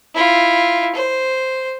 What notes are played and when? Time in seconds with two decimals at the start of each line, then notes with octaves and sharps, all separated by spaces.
0.15 E4 F4
0.95 C5